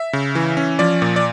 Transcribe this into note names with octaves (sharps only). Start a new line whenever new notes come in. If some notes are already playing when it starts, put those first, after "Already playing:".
Already playing: E5
C#3
E3
C#4
F3 D5
A#2
D5